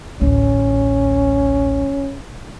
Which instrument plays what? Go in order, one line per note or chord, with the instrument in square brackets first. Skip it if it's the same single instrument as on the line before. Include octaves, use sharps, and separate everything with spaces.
[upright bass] A1 D2 [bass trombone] C#4